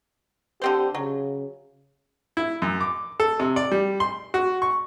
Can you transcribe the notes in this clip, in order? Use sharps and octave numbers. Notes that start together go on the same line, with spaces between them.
D3 C4 G4 C5
C#3 F#3
E4
F#2
D6
A4
C3
D5
G3
C6
F#4
C#6